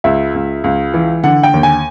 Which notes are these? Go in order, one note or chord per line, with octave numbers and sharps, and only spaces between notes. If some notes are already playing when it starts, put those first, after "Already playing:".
C#2 E5
C#2
C#2
E3
D3 F#5
G5
D#2
G#5